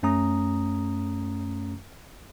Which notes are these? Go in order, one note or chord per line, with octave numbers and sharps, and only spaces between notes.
F#2 A3 C#4 A#5 D#6